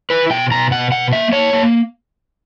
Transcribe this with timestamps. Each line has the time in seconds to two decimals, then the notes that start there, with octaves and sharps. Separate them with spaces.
0.10 E4 B4
0.30 B2 G5
0.51 B2 A#5
0.71 B2 F#5
0.92 B2 F#5
1.12 A#3 E5
1.32 A#3 C#5
1.53 A#3